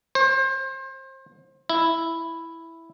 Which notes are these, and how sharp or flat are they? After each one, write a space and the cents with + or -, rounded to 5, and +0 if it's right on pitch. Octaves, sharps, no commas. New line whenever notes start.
C5 +30
E4 +0